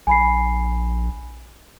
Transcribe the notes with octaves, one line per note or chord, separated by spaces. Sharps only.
A#1 G#5 B5 C7